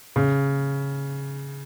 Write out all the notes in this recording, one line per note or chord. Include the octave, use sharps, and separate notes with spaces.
C#3